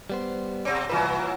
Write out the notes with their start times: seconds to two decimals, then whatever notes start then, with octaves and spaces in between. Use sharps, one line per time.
0.10 G3 B3 C5
0.65 B2 C4 D5
0.90 C2 A2 E3 F#3 B4